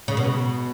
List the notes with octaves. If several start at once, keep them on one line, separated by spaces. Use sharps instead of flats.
C#3
B2